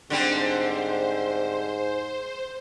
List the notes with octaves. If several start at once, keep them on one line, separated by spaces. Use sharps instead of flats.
G#2 D3 G3 C4 C5